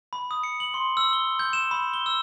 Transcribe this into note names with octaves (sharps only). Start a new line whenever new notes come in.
B5
D#6
C#7
F#7
C6
E6
G7
G6
E7
B5
G7
E6